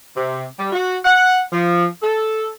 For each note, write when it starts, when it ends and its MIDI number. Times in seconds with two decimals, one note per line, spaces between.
0.16 0.43 48
0.58 0.70 55
0.72 0.97 66
1.04 1.39 78
1.51 1.86 53
2.02 2.49 69